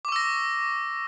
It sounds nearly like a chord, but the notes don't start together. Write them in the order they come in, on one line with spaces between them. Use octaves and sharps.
D6 C#6 E6 A#6